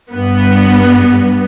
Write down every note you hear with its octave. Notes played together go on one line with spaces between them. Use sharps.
G2 B3